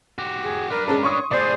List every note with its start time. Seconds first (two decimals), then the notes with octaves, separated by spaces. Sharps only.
0.18 F#4 G4
0.43 G#4
0.70 D4 A#4 B4
0.88 G#3 C#4 A#4 A5
1.03 C#5 C6 C#6 D#6
1.31 A2 G#4 C5 D5